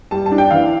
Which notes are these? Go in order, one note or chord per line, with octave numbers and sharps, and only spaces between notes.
G3 A5
A5
D4
G5
E3 F5